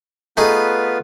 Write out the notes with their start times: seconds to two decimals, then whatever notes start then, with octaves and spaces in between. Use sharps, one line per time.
0.37 A3 B3 D#4 F4 G#4 B4